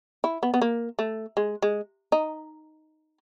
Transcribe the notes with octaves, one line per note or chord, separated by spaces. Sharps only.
E4
B3
B3
A#3
A3
G#3
G#3
D#4